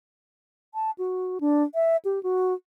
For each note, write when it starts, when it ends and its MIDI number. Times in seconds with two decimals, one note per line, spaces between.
0.74 0.91 81
0.98 1.38 66
1.41 1.63 62
1.75 1.97 76
2.05 2.22 67
2.23 2.54 66